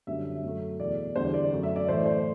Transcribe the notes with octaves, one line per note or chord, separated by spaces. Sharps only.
F#2 D3 G3 E5
F#2 F#3 A3
E2 B2 A3 D5
E2 D3 G3 C5
D5
F#2 F#3 A3
E5
D5
A2 E3 A3 C5
D5
C5